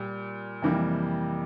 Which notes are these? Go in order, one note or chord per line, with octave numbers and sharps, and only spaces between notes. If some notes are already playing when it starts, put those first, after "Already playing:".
Already playing: A#2 G3
F2 C3 E3 G3 A#3